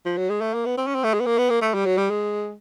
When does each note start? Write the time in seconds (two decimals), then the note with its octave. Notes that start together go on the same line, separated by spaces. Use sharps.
0.06 F3
0.17 F#3
0.30 G#3
0.41 A3
0.54 A#3
0.66 B3
0.77 C4
0.87 C#4
0.95 C4
1.04 A3
1.14 G#3
1.20 B3
1.26 A#3
1.38 B3
1.50 A#3
1.62 A3
1.74 G3
1.86 F#3
1.98 G3
2.10 G#3